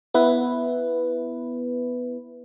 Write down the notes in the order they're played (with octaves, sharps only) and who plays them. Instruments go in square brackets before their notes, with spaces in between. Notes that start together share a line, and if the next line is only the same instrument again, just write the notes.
[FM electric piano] B3 E4 B4